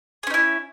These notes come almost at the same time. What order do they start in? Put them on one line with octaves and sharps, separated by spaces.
G#4 C#4 D#4 E4